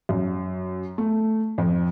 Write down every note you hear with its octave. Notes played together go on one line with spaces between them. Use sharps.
F#2
A3
F2